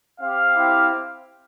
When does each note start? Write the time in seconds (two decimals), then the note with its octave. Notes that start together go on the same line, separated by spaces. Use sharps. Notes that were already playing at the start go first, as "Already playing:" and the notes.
0.20 C4 G4 F5
0.55 C4 E4 G4